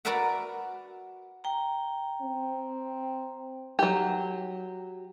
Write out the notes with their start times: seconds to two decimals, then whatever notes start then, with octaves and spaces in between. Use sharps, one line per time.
0.05 F#4 A#4 B4 D5 E5 F#5
1.44 G5 A#5
2.22 C4
3.79 F#3 G4